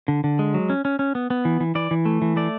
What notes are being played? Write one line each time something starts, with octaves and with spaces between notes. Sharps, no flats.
D3
D3
G#3
F#3
C#4
C#4
C#4
B3
B3
E3
E3
E3 D5
E3
A3
E3
A3 D5